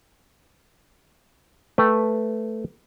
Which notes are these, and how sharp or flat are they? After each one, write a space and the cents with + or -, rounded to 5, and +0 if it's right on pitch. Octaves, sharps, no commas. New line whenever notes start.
A3 +0 B4 +0 G5 +15